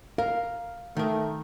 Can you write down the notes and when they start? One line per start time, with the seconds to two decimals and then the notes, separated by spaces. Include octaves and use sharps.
0.18 A#4 F5
0.97 D#3 A3 A#4